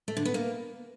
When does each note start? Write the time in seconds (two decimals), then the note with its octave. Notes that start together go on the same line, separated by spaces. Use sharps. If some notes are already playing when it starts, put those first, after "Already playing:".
0.08 A3
0.17 D3
0.25 B3
0.34 A#3